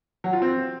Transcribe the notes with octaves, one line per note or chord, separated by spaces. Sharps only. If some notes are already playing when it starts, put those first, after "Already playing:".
F#3
F4
C4